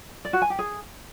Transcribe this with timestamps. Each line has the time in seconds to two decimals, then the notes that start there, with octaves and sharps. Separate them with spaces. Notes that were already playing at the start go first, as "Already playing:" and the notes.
0.25 D5
0.33 F#4
0.42 G#5
0.50 G4
0.59 G#4